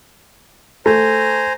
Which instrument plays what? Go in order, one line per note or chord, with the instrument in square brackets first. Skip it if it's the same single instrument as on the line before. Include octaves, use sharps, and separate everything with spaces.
[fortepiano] A3 [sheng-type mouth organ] C5 G#5 A#5